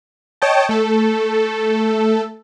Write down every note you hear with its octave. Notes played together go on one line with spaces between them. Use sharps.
C#5 D#5 G5 A5
A3 A4